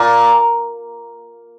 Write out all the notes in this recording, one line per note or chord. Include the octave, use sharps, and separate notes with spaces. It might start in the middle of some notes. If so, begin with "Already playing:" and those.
Already playing: A#2